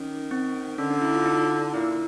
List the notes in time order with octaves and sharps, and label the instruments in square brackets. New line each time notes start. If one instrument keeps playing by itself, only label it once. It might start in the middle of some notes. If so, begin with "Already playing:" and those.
Already playing: [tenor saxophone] D#3 [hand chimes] C#4
[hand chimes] C4
[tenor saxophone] D3 [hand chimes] C#4
[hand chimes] D4
E4
F4
D#4
[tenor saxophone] A#2 [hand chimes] E4